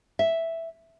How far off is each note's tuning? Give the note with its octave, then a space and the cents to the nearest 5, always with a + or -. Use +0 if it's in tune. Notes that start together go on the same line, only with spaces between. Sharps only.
E5 +0